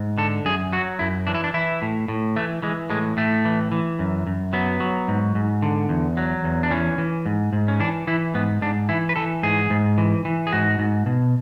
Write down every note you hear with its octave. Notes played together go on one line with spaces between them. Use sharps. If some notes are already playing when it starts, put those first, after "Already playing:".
Already playing: G#2
D3 A4
F#2 G#4
F#3 F#4
F#2 E4
E3 D4
E4
D4
E3 E4
A2
A2
E3 A3
E3 G#3
A2 G#3
A2 A3
E3
E3
F#2
F#2
F#3 B3
F#3
G#2
G#2
D3
E2
F#3
E2
D4
E3 C#4
E3
G#2
G#2
C#4
E3 D4
E3 E4
G#2 B3
G#2 D4
E3 E4
B4
E3 A4
G#2 G#4
G#2
E3
E3
G#4
G#2 F#4
G#2
B2